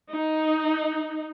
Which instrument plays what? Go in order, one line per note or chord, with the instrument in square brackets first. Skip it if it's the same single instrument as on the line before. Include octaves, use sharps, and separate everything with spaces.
[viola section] D#4